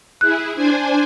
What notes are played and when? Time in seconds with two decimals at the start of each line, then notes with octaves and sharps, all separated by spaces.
0.21 E4 G#4 F#6
0.55 D4 C5 G#5